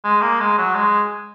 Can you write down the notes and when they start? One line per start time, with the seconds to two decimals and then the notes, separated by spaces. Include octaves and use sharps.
0.04 G#3
0.22 A#3
0.40 G#3
0.58 F#3
0.76 G#3